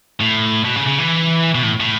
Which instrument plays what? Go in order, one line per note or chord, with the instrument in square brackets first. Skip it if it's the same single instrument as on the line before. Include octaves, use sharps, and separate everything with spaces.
[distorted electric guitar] A2
B2
C#3
C#3
E3
B2
A2
A2